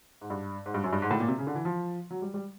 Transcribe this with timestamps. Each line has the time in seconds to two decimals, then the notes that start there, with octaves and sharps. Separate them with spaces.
0.21 G#2
0.30 G2
0.66 G#2
0.74 G2
0.84 F#2
0.93 G2
1.02 G#2
1.11 A2
1.20 A#2
1.28 C3
1.38 C#3
1.47 D3
1.55 E3
1.65 F3
2.11 F#3
2.22 G3
2.34 G3